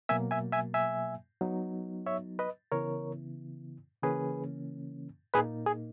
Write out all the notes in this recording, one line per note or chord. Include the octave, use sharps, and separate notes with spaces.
B2 F#3 A#3 E5 G#5
E5 G#5
E5 G#5
E5 G#5
F#3 B3 D#4
C#5 E5
B4 D#5
C#3 E3 B3 E4 A#4 C#5
C#3 E3 A#3 C#4 G#4 B4
A#2 A#3 D#4 G#4 B4
G#4